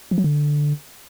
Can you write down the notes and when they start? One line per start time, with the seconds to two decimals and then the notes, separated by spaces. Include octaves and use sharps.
0.11 F3
0.18 F#3
0.24 D3